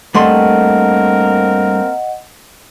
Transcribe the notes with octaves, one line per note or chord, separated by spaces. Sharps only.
G2 A3 A#3 C4 A#4 D#5 F#5 C6